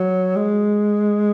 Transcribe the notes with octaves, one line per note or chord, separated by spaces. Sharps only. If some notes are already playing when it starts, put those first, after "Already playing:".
Already playing: F#3
G#3